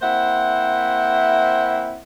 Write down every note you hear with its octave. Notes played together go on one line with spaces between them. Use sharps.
A#3 C4 E4 C5 E5 F#5